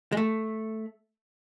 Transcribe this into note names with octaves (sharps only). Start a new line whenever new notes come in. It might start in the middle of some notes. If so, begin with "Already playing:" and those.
G#3
A3